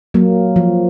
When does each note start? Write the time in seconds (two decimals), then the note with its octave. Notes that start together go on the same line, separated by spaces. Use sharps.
0.14 F#3 A#3
0.56 F3